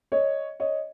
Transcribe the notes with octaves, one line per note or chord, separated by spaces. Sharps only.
C#5 D#5
C#5 D#5